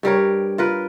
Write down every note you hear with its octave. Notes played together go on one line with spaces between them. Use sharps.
G2 G3 A#4 C#5
F4 A#4 B4